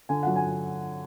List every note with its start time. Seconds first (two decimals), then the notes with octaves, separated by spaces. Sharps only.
0.09 D3 G#5
0.23 F#3 F#5
0.36 G#5